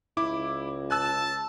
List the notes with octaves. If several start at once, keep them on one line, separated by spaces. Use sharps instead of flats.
C#2 E4 D6
A5 E6 F#6